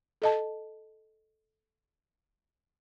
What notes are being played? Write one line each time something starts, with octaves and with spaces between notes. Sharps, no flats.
A4 D#5 A5